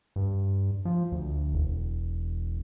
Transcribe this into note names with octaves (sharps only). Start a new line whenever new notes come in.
G2
F3
D2
E1